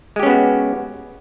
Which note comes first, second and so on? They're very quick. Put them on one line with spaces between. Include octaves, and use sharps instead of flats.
G#3 G4 C#4 B3 F#4